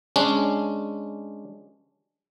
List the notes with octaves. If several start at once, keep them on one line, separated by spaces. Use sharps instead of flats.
G#3 C#4 D4